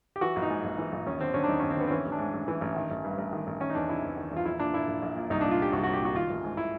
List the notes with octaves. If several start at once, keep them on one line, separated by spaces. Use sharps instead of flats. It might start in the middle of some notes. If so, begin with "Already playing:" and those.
G4
E3 F#4
A#1
D#4
G#2
A#1
E3
A#1
D#2 C#4
D3 C4
D3 C#4
D4
D#2 D#4
D#2 C#4
C4
D3 B3
C4
E3 C#4
A1
D4
G#2
A1
E3
A1
D#3
A1
G2
A1
D#3
A1
D#3 C#4
D#4
E2 D4
C3 E4
E2
D#3
E2
F4
A#1 E4
A#2 D4
A#2 E4
A#1
A#1
A#2
C2 D#4
A#2 D4
F4
A#2 G4
C2 F#4
C2 F#4
G4
A#2 F#4
D#3 F4
A1
G#2
E4